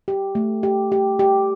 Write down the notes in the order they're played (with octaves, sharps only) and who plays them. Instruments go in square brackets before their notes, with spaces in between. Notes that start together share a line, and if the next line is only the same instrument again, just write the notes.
[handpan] G4
A3
G4
G4
G4